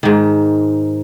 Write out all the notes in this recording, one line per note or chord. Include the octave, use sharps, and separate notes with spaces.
G#2 D#3